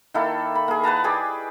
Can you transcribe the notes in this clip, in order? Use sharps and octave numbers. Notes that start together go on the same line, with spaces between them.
D#3 A#3 E4 A4
B5
A#3 G#4
B4 F#5 A5 A#5
G4 G#4 B4 D5